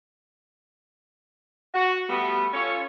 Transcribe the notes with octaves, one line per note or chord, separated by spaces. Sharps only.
F#4
G3 A3 B3
C#4 F4 A4 C#5